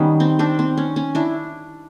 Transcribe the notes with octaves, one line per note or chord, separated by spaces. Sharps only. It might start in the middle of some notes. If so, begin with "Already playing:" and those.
Already playing: D#3 G3 B3 C#4
C4
C4 D4
C4
C#4
C#4
D4 E4